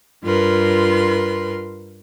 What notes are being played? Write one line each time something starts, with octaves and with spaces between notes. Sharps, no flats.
G2 F4 A#4 B4 C6